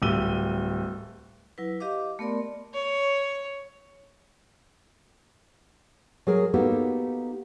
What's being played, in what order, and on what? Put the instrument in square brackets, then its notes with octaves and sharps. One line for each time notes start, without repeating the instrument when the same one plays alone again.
[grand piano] D1 G3 E6 D#7 G7
[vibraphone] F#3 E4 B4
G4 D#5 F5 D6
A3 B3 A#4 D5 C6
[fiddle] C#5
[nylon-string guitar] F#3 G#4 A#4
A#3 B3 D#4 F#4 G4 A4